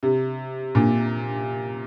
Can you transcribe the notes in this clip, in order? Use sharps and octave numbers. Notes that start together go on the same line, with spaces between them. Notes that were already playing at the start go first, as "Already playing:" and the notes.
C3
A#2